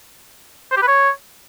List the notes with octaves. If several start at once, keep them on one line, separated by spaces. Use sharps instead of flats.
C5
G4
B4
C#5